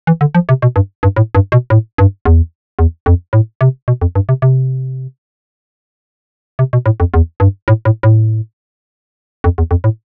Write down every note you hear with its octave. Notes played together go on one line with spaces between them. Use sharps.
E3
D3
F3
C3
B2
G2
G2
A2
G2
B2
A2
G2
E2
E2
F2
A2
C3
B2
F2
G2
C3
C3
C3
B2
A2
F2
E2
G2
A2
A2
A2
F2
E2
F2
A2